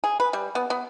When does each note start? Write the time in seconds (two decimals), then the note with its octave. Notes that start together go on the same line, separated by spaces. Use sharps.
0.04 G#4
0.20 B4
0.33 G3
0.55 B3
0.70 B3